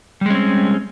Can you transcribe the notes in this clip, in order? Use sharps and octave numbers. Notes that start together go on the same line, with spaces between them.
G3 G#3 C4 C#4